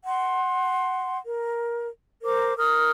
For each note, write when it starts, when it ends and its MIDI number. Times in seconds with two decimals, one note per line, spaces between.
0.05 1.16 78
0.05 1.16 84
1.27 1.88 70
2.23 2.55 70
2.23 2.55 72
2.23 2.55 86
2.57 2.91 70
2.57 2.91 87
2.57 2.91 89